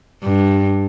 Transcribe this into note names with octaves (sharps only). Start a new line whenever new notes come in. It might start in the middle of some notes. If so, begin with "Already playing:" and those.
G2